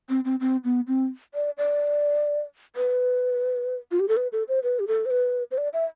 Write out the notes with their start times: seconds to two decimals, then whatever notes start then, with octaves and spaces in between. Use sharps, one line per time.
0.09 C4
0.25 C4
0.40 C4
0.64 B3
0.87 C4
1.34 D5
1.58 D5
2.76 B4
3.91 F4
4.00 G4
4.08 A4
4.17 B4
4.32 A4
4.48 C5
4.63 B4
4.80 G4
4.88 A4
5.06 C5
5.11 B4
5.51 C5
5.58 D5
5.73 E5